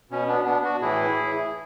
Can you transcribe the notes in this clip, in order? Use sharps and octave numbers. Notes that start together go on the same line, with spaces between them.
B2 C#4
B3 D4
B3 D4
D4 F#4
A2 E3 E4 G#4